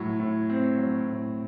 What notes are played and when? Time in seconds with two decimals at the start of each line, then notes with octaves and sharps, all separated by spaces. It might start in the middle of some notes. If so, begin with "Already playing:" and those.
Already playing: A2 F#3
0.20 A2
0.49 C4
0.78 F#3
1.06 A2